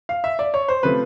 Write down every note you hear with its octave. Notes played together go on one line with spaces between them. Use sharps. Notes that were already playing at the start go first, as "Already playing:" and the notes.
F5
E5
D5
C#5
C5
C3 F3 A3 B4